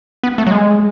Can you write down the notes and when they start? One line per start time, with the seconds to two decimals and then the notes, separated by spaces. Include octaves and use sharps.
0.23 B3
0.38 A3
0.47 F#3
0.51 G#3